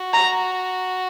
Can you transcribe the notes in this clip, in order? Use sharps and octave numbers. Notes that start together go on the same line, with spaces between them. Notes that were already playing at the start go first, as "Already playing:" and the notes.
Already playing: F#4
A#5